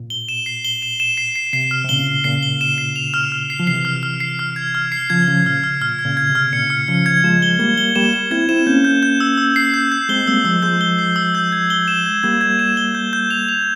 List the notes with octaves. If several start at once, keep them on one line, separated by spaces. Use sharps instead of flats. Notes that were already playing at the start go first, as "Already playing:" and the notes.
Already playing: A#2
G7
E7
C7
G7
E7
E7
C7
C7
C3 C7
F6
C3
A#2 C#3 G7
G7
A#2 C#3 C7
G7
E7
C7
F7
F6
F6
C7
F3
C3 E3 C7
F6
F6
C7
F6
G#6
F6
C7
C#3 F3 G#6
C#3 F3 G#6
A#2 C#3 F6
F6
A#2 F6
G#6
A#2 C#3
G#6
C3
F6
A#2 C#3 C#7
F6
C#3 F3 C#7
G#6
F3 G#3 E7
G7
G3 A#3 G#6
G7
G3 A#3 E7
E7
C4 E4 G#6
C4 E4 E7
A#3 C#4 G6
G6
G6
E6
E6
C7
G6
G6
G#3 C4 G7
G3 A#3 E6
F3 G#3 E6
F3 G#3 G6
G7
C7
E6
G6
G#6
G7
E7
G#6
G3 A#3 G#6
G#6
E7
G7
G6
G6
F7
F7